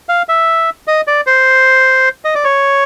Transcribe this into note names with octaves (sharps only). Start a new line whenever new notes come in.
F5
E5
D#5
D5
C5
D#5
D5
C#5